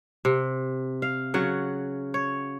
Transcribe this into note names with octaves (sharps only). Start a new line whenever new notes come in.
C3
F5
C#3 F#3 F#5
C#5